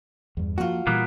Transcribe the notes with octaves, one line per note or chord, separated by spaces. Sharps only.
E2 G2
F3 A#3 F4 F#4
A#2 E3 G3 A#3 B3